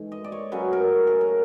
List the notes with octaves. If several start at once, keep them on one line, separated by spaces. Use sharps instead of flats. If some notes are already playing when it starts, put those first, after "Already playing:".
Already playing: G#2 E3 A3
D#5
D5
C#5
C#3 F#3 A3 C#4 B4
A#4
G#4
A#4